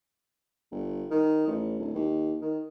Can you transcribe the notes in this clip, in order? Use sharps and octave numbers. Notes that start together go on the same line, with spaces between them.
G1
D#3
A1
D1
D#2
D#3